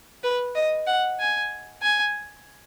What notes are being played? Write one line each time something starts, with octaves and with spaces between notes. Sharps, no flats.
B4
D#5
F#5
G#5
G#5